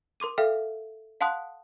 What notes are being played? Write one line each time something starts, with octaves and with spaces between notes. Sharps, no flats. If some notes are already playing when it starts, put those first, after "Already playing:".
A#4 C6 D6 D#7
A4 E5 F5 G5 F6
F5 F#5 A5 C6 D#6 F#6